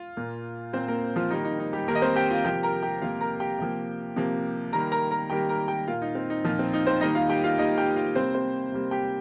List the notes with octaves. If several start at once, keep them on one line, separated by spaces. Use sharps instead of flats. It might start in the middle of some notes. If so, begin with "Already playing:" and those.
Already playing: F4
A#2 A#3
A#2 A#3 C4 C5
A#3 A#4
F3 F4
D#3 G3 A#3 D#4
D#4
D#4
G3 G4
D#3 G3 A#3 A#4
D#5
C4 C5
G4 G5
F4 F5
C3 F3 A#3 G4 G5
A#4 A#5
G4 G5
C3 F3 A#3 F4 F5
A#4 A#5
G4 G5
C3 F3 A#3
C3 F3 A#3
D#3 G3 A#3 A#4 A#5
A#4 A#5
A#4 A#5
D#3 G3 A#3 G4 G5
A#4 A#5
G4 G5
A#2 A#3 F4 F5
D#4
C4
D#4
A#2 F3 A#3 F4
C4
D#4
C4 C5
D#3 G3 A#3 D#4 D#5
F4 F5
G4 G5
F4 F5
D#3 G3 A#3 D#4 D#5
G4 G5
F4 F5
C3 G3 A#3 C4 C5
C4 C5
C3 G3 A#3
G4 G5